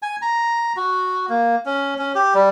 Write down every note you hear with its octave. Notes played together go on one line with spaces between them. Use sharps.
G#5
A#5
F#4
A#3
C#4
C#4
G4
G3